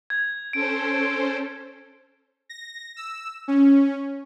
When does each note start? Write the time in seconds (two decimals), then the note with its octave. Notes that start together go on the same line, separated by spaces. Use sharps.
0.10 G#6
0.53 C#4 A4 C5 D7
2.49 A#6
2.96 E6
3.48 C#4